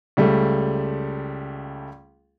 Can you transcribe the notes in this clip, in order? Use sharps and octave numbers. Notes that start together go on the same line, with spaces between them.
C#2 G3 A3